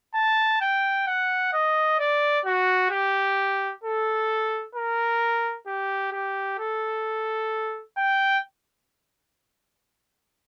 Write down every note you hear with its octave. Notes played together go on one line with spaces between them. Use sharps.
A5
G5
F#5
D#5
D5
F#4
G4
A4
A#4
G4
G4
A4
G5